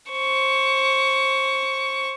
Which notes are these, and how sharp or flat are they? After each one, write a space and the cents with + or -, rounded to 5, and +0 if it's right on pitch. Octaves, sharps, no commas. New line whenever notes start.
C5 +25 C#6 +10